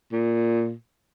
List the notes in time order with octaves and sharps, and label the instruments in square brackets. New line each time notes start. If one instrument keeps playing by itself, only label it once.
[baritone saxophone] A#2